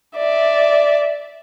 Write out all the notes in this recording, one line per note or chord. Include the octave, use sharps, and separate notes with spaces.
D5 E5